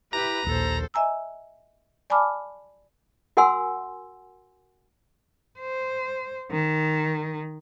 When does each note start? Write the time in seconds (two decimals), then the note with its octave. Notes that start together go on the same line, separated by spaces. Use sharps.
0.13 E4 G4 B4 A#5
0.47 A#1 D#2 A4 C5
0.94 D#5 E5 G#5 A#5 E6
2.10 D5 G#5 A5 B5 D6 F6
3.37 F#4 A#4 F#5 G#5 C6 E6
5.59 C5
6.51 D#3